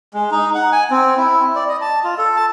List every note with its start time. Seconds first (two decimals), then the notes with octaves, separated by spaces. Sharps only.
0.14 G#3
0.31 D#4
0.55 F#5
0.72 G#5
0.91 C4
1.17 E4
1.56 D5
1.69 D#5
1.81 A5
2.04 F4
2.18 A4
2.36 A5